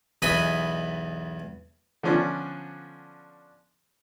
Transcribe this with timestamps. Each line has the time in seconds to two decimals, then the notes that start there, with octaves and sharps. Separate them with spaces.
0.22 B1 E2 B4 D#5 G#5 B5
2.03 D3 F3 B3 C#4 D4